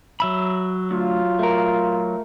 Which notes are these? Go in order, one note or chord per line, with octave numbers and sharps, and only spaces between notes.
F#3 E5 B5
D2 F4
A3 A#4